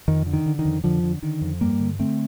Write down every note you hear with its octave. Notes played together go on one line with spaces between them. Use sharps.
F2 D#3
D3
D#3
D3
D#3
F2
F2 D3 F3
D3
D3 D#3
F2
G2 G3 A#3
D3
D3 A3 C4